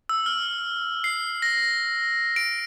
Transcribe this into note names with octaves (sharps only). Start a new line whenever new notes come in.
E6
F6
C7
A#6
D7